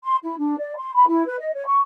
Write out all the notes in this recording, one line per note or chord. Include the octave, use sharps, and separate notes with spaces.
C6
E4
D4
D5
C6
B5
E4
B4
D#5
C#5
C#6